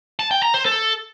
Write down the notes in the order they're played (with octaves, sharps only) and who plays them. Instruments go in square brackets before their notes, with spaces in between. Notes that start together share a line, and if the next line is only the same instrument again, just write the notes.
[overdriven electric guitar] A5
G5
A#5
C5
A4